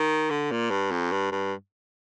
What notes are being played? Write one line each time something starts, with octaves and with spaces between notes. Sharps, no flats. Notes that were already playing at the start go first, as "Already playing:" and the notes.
Already playing: D#3
D3
A#2
G2
F2
G2
G2